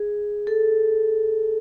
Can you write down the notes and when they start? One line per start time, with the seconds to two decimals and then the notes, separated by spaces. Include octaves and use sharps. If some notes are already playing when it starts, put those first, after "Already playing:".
Already playing: G#4
0.47 A4